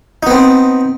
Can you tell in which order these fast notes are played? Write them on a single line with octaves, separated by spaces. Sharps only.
D#4 B3 C4